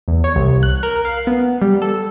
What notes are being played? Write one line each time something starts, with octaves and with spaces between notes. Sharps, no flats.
E2
C#5
C2
F#6
A#4
F5
B3
G3
A4